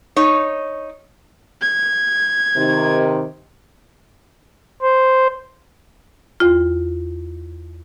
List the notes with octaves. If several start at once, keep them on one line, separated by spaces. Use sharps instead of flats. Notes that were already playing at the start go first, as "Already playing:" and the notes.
D#4 C#5
G#6
C3 D#3
C5
E2 F4